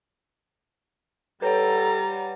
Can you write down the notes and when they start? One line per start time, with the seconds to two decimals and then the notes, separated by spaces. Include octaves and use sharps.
1.42 G3 A4 B4 C#5 F#5 A#5 A6